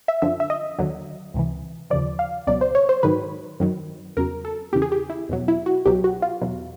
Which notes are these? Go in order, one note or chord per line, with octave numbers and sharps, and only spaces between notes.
E5
F#2 D3 F3 E5
E5
D#5
D#2 D3 F#3
C#2 C3 E3
D#2 C#3 F3 D5
F5
C#2 B2 F#3 D5
C5
C#5
C5
G#2 D#3 F#3 B4
F#2 D#3 F#3
E2 C#3 F#3 A#4
A4
E2 C#3 E3 G4
G#4
G4
E4
E2 B2 F#3
E4
F#4
C2 B2 F#3 G4
F#4
F4
E2 B2 F#3